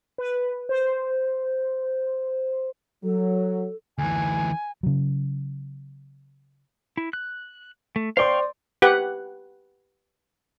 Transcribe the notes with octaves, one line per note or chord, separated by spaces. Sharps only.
B4
C5
F#3 A4
D2 E3 G#5
C#3 F#3
E4
F#6
A3
C5 D5 F5 G5 C6 C#6
G4 B4 F#5